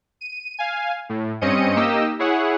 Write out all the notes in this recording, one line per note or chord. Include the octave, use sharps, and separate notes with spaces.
D#7
F5 G#5
A2
G2 C4 C#4 D#5 C#7 D#7
A#3 D#4 G4 D#5 E6
E4 G#4 C#5 F#5